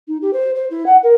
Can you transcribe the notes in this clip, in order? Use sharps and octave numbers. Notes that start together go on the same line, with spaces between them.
D#4
G4
C5
C5
E4
F#5
A#4